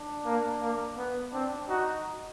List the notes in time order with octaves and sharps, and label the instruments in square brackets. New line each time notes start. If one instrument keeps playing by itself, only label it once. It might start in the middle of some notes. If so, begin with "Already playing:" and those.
Already playing: [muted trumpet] D4
[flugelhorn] A#3
A#3
B3
[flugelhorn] C4 [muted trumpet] D4
[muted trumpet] D#4 [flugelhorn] F#4